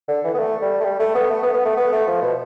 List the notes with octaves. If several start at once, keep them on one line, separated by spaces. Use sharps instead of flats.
D3
E3
B3
A3
G3
A3
G3
A3
B3
A3
B3
B3
A3
B3
A3
F3
B2